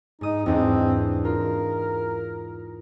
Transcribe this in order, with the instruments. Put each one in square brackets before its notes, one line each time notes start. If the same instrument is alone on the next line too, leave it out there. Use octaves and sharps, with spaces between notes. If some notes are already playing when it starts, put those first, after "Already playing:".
[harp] G#2 D#6 [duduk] D#4
[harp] E2 G#2 D4 [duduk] C4
[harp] F4 [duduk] A#4